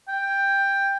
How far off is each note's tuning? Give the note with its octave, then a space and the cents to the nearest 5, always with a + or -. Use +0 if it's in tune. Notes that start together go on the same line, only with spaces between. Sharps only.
G5 +10